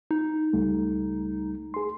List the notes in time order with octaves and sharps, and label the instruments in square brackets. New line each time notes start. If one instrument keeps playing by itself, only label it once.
[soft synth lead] D#4
[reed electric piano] C#2 G3 A3
G#4 C6